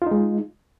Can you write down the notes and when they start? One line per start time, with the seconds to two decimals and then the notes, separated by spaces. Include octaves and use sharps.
0.02 F4
0.07 D#4
0.11 G#3